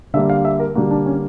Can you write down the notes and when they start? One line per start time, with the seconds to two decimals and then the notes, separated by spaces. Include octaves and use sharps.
0.14 D3 G3 A#3 E5
0.30 F5
0.45 E5
0.60 A#4
0.75 D3 G3 A#3 F#4
0.91 D4
1.06 C#4